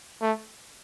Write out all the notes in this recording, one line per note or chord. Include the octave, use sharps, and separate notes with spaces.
A3